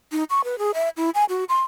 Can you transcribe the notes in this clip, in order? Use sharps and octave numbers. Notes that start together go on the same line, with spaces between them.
D#4
C#6
B4
G#4
E5
E4
G#5
F#4
C6